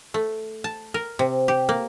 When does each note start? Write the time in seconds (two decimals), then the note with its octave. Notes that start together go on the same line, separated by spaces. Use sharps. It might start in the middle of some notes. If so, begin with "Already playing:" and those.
0.14 A3
0.64 A5
0.94 A#4
1.19 C3
1.48 G4
1.69 A#3